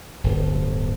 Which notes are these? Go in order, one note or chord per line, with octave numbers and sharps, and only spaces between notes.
D1 G1